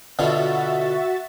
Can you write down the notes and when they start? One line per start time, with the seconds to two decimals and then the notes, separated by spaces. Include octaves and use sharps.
0.19 B2 D3 F4 F#4 E5 A6